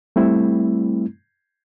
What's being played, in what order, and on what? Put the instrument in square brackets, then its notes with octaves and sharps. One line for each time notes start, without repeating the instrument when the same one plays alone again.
[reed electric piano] G3 A3 C4 E4